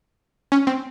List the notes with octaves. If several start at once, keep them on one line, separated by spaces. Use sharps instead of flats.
C#4
C4